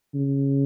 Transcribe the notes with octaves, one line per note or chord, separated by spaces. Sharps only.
C#3